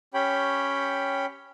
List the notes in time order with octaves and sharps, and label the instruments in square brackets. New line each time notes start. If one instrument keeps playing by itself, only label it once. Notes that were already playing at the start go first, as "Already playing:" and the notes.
[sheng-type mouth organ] C#4 G4 C#5 G5 B5